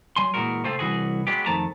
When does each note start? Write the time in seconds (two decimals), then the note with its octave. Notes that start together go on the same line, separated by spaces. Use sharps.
0.16 F#3 G#5 C6
0.34 A#2 E3 F3 G#3 F#4 A#4
0.64 C3 A3 C4 F4
0.79 C2 E3 F#4 G#4
1.27 F#3 G#3 B3 G4
1.46 F2 D#3 F3 A3 A5 A#5